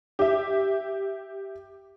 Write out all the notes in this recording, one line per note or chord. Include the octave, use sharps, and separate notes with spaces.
G4 E5